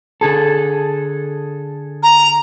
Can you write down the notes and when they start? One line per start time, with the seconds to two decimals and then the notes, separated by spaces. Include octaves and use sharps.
0.21 D3 G#4 A4
2.03 A#5